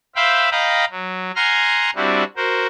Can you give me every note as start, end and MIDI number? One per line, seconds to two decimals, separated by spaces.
0.16 0.50 72
0.16 0.50 76
0.16 0.50 77
0.16 0.50 79
0.16 0.50 83
0.51 0.85 75
0.51 0.85 77
0.51 0.85 79
0.51 0.85 82
0.51 0.85 83
0.90 1.31 54
1.36 1.90 78
1.36 1.90 80
1.36 1.90 82
1.36 1.90 84
1.36 1.90 89
1.96 2.24 55
1.96 2.24 60
1.96 2.24 62
1.96 2.24 64
1.96 2.24 66
2.36 2.67 66
2.36 2.67 70
2.36 2.67 72